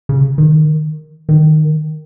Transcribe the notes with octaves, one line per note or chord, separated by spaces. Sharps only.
C#3
D#3
D#3